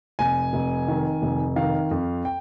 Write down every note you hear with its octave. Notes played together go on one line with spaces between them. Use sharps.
F1 G#5
F1
D#3
F1
D#3 F5
F2
G5